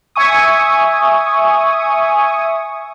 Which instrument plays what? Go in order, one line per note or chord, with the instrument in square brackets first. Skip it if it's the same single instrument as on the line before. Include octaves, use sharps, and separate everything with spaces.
[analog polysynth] E5 G#5 C#6 D#6